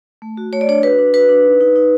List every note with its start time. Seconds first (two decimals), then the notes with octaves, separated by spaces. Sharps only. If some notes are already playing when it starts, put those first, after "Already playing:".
0.22 A3
0.37 F#4
0.53 A3 C#5
0.61 D5
0.68 D4 C#5
0.83 F#4 B4
0.99 D4
1.14 F#4 B4
1.29 D4
1.45 D#4
1.61 D#4
1.76 D#4